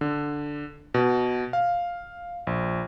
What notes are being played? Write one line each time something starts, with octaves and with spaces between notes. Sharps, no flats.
D3
B2
F5
A#1